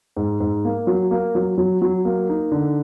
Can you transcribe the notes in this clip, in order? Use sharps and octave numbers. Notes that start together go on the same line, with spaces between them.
G#2
G#2
A#3
F#3
A#3
F#3
F#3
F#3
A#3
D#4
D3